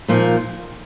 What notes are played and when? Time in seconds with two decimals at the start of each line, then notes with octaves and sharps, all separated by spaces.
0.08 A#2 F3 A#3 D#4